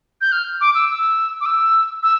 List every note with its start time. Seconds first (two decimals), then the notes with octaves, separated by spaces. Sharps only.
0.21 G6
0.32 F6
0.61 D6
0.75 E6
0.89 E6
1.41 D6
1.46 E6
2.03 E6